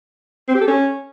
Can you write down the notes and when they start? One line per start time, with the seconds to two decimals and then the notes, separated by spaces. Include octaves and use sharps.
0.49 C4
0.55 G4
0.61 A4
0.68 C#4